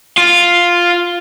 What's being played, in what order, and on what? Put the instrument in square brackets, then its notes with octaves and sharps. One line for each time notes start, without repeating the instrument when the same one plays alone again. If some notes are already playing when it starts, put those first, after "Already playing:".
[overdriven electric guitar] F4